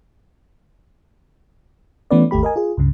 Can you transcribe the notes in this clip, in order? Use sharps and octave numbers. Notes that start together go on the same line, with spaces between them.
E3 A3 B3 C#4 B4 D5
G#1 D#2 A3 G4 B5
A#4 D#5 G#5
F4 G#4
C#2 G2 C#3